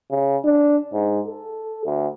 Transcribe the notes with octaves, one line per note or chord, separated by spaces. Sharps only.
C#3
D4
G#2
A4
D2